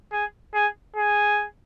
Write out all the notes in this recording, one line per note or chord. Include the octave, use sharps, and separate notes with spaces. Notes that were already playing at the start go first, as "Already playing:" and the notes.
G#4
G#4
G#4